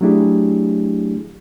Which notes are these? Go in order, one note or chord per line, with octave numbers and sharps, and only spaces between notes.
F#3 A3 D4 E4 G4 G#4